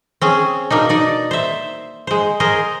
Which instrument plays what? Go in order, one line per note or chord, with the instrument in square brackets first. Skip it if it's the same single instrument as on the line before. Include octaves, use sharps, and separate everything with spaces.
[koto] C4 C#4 G#4
B2 A#3 D4 D#4
D#4 D5
C5 E5
G#3 C5
G#4 A#4 C5 D#5